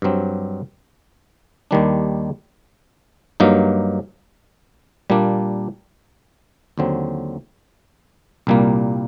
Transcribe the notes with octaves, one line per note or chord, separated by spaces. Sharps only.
G2 F#3 C4
D#2 D#3 G3 D4
G2 F#3 A#3 D#4
A#2 G3 A#3 D4
D#2 D3 F#3 C4
C2 A#2 G3 A#3